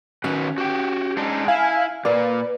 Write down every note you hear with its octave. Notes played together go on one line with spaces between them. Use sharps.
D#3 C#4 F#4 B4
F#4 G4 G5
G#3 D4 D#4
E4 F5 G#5
A#2 A#3 B4 D5